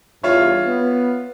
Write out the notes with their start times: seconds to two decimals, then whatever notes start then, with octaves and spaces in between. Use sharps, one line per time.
0.23 E2 G2 F4 C#5 E5
0.67 B3